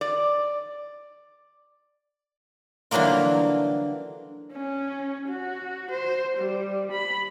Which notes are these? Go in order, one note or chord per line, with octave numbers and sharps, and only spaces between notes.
D5
D3 E3 F#3 G3 A#3 F4
C#4
F#4
C5
G3
B5